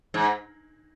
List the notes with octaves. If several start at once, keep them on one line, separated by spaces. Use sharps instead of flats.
G#2